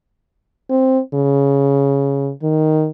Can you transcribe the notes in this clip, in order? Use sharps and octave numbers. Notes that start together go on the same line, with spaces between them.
C4
C#3
D#3